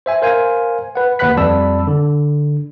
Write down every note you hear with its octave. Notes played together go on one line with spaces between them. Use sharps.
C5 E5 G#5
A#4 C5 F5 G#5
B4 F#5
D#2 B4 F#5 B5 F#6 B6
F2 G3 D5 A5 B5 E6
D3